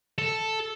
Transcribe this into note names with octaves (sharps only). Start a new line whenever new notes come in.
A4